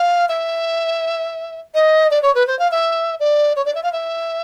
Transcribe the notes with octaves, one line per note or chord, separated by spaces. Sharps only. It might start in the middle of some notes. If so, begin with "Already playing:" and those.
Already playing: F5
E5
D#5
D5
C#5
B4
C5
F5
E5
D5
C#5
D5
E5
F5
E5